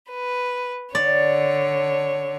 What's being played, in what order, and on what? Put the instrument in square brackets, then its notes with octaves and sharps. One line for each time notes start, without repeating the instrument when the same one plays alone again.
[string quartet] B4
[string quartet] D3 C#5 [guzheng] D5